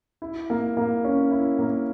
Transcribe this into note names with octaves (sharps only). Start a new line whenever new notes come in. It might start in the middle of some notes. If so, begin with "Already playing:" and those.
E4
A#3
A#3
C#4
E4
A#3